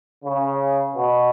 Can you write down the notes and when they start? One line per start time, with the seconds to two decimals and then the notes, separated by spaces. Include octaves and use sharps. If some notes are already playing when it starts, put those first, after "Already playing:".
0.25 C#3
0.95 B2